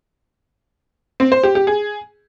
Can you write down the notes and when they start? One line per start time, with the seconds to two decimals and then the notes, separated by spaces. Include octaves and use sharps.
1.20 C4
1.32 C5
1.43 G4
1.55 G4
1.67 G#4